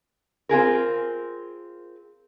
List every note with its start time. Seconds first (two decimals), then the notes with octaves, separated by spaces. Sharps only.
0.49 C4 F4 G#4 A#4